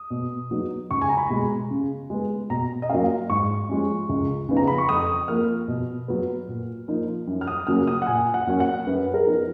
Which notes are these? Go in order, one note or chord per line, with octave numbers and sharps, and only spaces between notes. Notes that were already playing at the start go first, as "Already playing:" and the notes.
Already playing: D#6
B2
F#3 B3 D#4
C#2 C#6
G#5
A#5
B5
B2 G#3
C#3
G#3 B3
B2 A#5
D#5
F#3 A#3 C#4 F5
G#2 C#6
F3 G#3 C#4
C#2
C#3 F3 B3 D#4
A#5
B5
C#6
F2 D#6
F3 A#3 F6
B2
F#3 B3
A#2
F3 A#3 D#4
F#2
F6
D#6
C#3 F#3 A#3 C#4 F6
D#6
F#5
A#2 G#5
F#5
F#3 A#3 C#4
F#5
F#2 B4
A#4
F3 B3 D#4